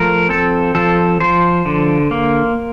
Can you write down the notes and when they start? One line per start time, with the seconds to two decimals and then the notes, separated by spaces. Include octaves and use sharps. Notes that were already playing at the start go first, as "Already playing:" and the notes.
Already playing: F3 A3 A#4
0.29 C4 A4
0.75 F3 A4
1.20 F3 C5
1.66 D3
2.11 A#3